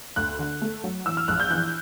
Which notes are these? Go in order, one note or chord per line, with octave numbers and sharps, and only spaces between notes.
D2 F#6
D3
A3
F#3
E3 E6
F6
A#1 F#6
G6
E3 F#6